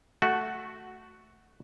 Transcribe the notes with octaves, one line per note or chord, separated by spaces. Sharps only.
A3 F#4